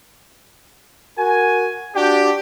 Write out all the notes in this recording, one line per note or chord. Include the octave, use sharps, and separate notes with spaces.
F#4 A#4 G#5
D4 F#4 G4